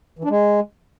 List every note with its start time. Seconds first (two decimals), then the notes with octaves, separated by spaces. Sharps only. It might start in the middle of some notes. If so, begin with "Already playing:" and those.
0.19 E3
0.24 D4
0.30 G#3